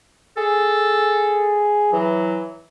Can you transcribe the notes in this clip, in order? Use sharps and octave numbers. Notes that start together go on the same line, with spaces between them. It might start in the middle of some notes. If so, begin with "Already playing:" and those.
G#4 A4
E3 F#3